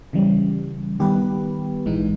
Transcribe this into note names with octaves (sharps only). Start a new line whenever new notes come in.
C#3 E3 G3
D#3 G3 B3 G4 B4
A#1 G#2 E3 G#3 D#4